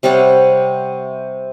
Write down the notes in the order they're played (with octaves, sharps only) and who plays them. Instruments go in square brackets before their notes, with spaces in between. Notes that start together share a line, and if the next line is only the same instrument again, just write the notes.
[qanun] C3 G3 C#5 F#5